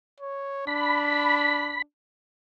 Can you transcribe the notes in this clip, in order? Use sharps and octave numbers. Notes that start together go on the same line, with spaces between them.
C#5
D4 B5